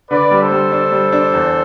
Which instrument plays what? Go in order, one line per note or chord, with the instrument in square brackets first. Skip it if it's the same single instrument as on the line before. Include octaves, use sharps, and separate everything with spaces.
[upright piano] D3 [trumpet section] B4 D5
[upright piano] G3
[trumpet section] A4 C5
[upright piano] G3
D4
G3
D4
E2